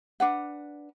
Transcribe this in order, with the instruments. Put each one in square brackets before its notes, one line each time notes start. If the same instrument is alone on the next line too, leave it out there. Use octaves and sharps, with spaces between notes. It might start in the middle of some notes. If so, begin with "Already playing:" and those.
[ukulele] D4 B4 F#5